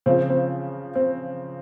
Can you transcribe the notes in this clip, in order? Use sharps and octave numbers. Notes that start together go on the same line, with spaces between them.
C#3 F3 C4
C4
C4